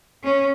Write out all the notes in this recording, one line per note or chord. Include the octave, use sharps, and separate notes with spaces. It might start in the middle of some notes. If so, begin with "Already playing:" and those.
C#4